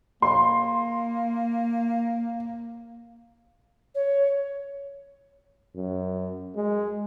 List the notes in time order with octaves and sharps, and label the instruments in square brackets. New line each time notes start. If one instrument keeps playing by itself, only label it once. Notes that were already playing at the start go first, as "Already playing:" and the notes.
[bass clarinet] A#3 [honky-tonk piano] C6
[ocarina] C#5
[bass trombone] F#2
G#3